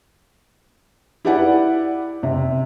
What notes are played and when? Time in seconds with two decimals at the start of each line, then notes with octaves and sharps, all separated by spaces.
1.25 E4 G4 B4 D5 F#5
2.23 C3